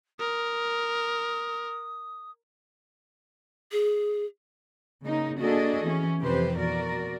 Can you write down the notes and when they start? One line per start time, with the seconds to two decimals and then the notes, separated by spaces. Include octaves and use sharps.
0.19 A#4 D#6
3.72 G#4
5.04 C#3 A#3 D#4
5.38 A#3 D4 F#4 G#4 A4 D#5
5.84 E3 C#4
6.21 F2 C3 E3 G4 B4 C5
6.59 B2 F#4 A#4 D5